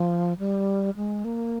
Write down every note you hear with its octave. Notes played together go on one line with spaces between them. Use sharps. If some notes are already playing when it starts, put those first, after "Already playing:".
Already playing: F3
G3
G#3
A#3